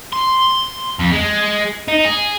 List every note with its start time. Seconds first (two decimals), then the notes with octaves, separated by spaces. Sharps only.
0.13 C6
1.00 F2
1.13 G#3
1.88 D#4
2.05 G#4